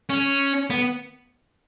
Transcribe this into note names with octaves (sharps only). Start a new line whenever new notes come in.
C#4
B3